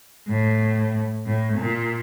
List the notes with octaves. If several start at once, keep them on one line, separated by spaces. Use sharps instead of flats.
A2
A2
A#2